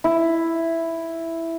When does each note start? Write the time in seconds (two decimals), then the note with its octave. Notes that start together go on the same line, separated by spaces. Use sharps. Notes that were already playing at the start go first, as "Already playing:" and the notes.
0.04 E4